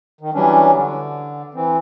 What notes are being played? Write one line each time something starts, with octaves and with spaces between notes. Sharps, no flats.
D#3
E3 F#3 G3 C#4 D4
D3
E3 C4